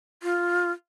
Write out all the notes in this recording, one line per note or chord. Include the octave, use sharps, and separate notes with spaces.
F4